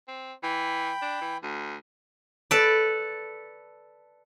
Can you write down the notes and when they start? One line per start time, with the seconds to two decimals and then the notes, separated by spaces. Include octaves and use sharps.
0.08 C4
0.43 E3 G5 B5
1.02 D4
1.21 E3
1.43 D2
2.51 A4 B4 D5